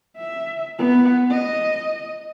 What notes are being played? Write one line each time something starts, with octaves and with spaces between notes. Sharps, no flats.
E5
B3 F#5
D#5